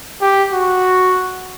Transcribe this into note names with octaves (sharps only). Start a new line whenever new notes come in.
G4
F#4